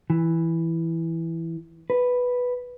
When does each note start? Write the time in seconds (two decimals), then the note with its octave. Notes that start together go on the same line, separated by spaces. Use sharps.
0.10 E3
1.90 B4